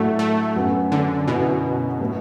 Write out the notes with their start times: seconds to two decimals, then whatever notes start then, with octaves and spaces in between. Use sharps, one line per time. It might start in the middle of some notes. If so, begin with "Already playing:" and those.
Already playing: A2 F#3 A3 D4 F#4 A4
0.19 A3
0.56 F#2 F#3 B3 F#4
0.92 D3
1.28 F#2 B2 D3 B3 E4 A4
2.01 A2 F#3 B3